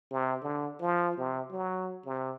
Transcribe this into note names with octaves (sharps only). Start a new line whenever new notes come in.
C3
D3
F3
C3
F#3
C3